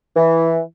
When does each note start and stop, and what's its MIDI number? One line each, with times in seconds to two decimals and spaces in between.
0.16 0.58 52